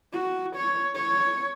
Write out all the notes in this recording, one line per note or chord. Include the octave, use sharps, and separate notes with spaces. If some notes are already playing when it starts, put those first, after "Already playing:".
F#4
C#5
C#5